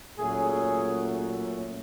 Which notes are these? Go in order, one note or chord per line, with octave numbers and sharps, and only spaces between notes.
A#2 F#3 A3 C#4 G#4
G#4